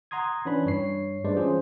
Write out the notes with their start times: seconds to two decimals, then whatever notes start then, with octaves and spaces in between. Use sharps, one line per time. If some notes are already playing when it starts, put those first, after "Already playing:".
0.11 F#5 A#5 C6 D#6 G#6
0.45 E3 C#4 D4 B4 B5
0.65 G2 C#5 C7
1.24 G3 G#3 D4 B4 C5 D5
1.36 E3 C#4 F4 G#4 C5